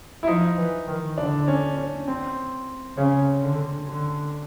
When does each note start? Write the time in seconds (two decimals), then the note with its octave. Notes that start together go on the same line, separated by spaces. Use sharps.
0.23 E4
0.27 F3 D#4
0.57 E3
0.87 D#3
1.17 D3 D4
1.48 C#4
1.77 C#4
2.08 C4
2.97 C#3 C#4
3.43 D3
3.87 D3